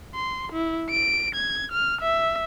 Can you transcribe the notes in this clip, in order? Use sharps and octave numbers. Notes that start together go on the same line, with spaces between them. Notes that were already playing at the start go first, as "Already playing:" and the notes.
C6
E4
D7
G#6
F6
E5